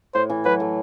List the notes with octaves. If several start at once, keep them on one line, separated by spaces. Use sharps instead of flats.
A2 C5
E3
F#3 B4
A3